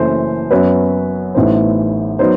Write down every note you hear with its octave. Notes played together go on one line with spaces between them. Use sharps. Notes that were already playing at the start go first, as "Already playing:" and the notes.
Already playing: F#1 F#2 E3 A3 C5
F#2 F#3 B3 B4
A1 A2 E3 B3 D#4 C5
F#3 B3 D#4 C5